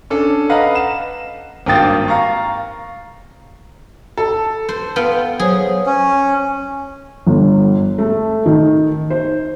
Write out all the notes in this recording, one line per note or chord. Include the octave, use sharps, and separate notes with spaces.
C#4 D4 A4
B4 D#5 F5 F#5 A#5
E7
G#1 G2 A#3 G5 D#6 A6
F5 A#5 C#6
A4
C5
B3 F4 G5
F#3 G#4 C5 C#5
C#4
G1
A3
D#3
C5